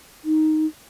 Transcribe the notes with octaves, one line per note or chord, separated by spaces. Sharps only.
D#4